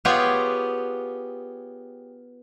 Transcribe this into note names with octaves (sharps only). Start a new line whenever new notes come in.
B3 F4 G4 G#4 C#5